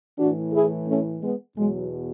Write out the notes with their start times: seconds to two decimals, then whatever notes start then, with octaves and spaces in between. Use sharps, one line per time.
0.18 A2 E3 D4 F#4
0.53 E4 G#4
0.87 A3 C#4
1.21 G#3 B3
1.57 E2 B2 F#3 G#3